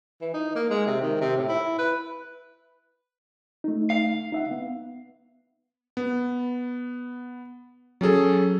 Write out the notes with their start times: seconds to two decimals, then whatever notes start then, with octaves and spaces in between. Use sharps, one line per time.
0.21 E3
0.34 D#4
0.56 A#3
0.70 G#3
0.87 C3
1.02 D#3
1.21 C3
1.37 A2
1.49 E4
1.78 B4
3.64 A3 D#4
3.90 F5
4.32 D#4 E5 F#5
4.51 B3
5.97 B3
8.01 F#3 C#4 G#4 A4